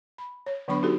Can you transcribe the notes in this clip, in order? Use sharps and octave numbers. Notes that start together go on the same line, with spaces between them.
B5
C#5
D3 F#3 B3 D4 B5 C#6
D#4 F#4 G4 A4